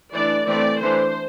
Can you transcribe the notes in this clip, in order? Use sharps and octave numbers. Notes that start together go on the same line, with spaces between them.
E3 A3 D4 D5
E3 A3 C4 D5
E3 A3 D4 C5